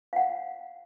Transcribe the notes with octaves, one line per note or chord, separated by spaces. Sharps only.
F5 F#5